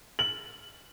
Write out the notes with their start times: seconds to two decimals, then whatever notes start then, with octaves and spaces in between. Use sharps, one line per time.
0.19 F#7